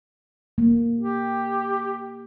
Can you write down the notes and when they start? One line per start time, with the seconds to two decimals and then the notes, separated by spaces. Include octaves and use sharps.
0.58 A#3
0.98 G4